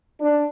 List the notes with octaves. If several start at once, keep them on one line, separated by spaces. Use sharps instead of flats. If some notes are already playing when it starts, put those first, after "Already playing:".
D4